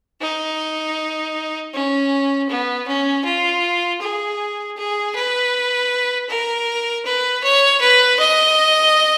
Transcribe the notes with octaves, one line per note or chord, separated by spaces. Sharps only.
D#4
C#4
B3
C#4
F4
G#4
G#4
B4
A#4
B4
C#5
B4
D#5